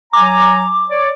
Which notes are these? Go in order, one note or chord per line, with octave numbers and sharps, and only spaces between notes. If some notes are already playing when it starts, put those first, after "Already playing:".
F#3 G#5 A#5 D6
C#5 D5